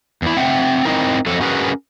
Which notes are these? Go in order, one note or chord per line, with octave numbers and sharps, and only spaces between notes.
E2 E4
C4 E5 F#5 G5
C4 C#4 D#4 E4 A#4
F2 F#3 A4
C#4 F#4 G#4 A#4 B4